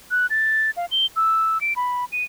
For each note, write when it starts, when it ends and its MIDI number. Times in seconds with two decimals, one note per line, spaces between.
0.11 0.26 90
0.30 0.71 93
0.77 0.86 77
0.91 1.06 103
1.16 1.61 88
1.61 1.73 98
1.76 2.05 83
2.12 2.24 99